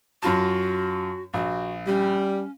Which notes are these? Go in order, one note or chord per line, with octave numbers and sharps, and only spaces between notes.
F#2 F4 F#4 A5
A#1 F#4
G3 C#4